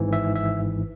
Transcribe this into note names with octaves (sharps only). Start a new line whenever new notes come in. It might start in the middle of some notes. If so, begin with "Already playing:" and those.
Already playing: G#1 G#2 E3
E5
E5